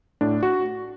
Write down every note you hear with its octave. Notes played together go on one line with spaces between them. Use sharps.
A2 D4
F#4